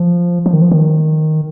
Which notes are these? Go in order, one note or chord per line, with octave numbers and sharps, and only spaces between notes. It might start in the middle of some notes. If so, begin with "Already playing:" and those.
Already playing: F3
F3
D#3
F3
D#3